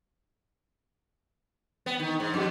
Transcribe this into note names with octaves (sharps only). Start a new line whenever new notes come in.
B3
D#3
G#2
F2